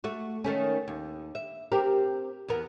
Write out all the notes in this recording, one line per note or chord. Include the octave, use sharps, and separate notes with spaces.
A3 F#4
D#3 A3 C#4
D#2
E5
C4 G4 A#4
E2 B3 A#4